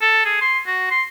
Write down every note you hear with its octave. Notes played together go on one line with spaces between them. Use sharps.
A4
G#4
C6
F#4
C6